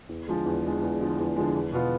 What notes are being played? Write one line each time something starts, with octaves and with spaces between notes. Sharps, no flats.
E2
D3 F3 G#3
E2
D3 F3 G#3
E2
D3 F3 G#3
E2
D3 F3 G#3
E2
B2 B3 F4